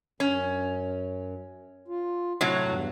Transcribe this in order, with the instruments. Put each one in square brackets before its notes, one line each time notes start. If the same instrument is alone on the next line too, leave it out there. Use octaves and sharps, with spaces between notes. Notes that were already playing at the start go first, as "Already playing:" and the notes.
[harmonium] F#2 [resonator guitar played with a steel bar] C#4
[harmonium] F4
[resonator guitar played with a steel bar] A2 C3 F#3
[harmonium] E2 G2